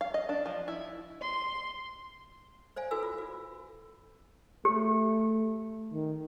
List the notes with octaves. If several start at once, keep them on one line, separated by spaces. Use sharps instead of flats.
F5
D#5
D4
F3
E4
C6
C5 D5 F5 G#5
E4 F#4 A4 B4 G#5 E6
F4
F#4
A3 G4
D#3